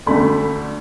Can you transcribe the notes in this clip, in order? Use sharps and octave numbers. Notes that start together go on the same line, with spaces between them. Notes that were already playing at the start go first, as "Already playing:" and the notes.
D2 D3 A3 B5